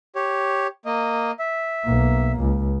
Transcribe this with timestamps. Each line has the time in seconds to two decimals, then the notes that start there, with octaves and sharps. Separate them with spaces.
0.15 G4 C#5
0.85 A#3 D#5
1.39 E5
1.85 B1 A#3
2.41 C#2